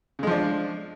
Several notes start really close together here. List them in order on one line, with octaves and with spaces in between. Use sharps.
C#3 G#3 F3 D4